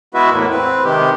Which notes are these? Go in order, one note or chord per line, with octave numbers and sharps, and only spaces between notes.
G#3 B3 E4 F#4 B4 E5
E2 A2 A#3
C4 B4
C3 D#3 G#3 G4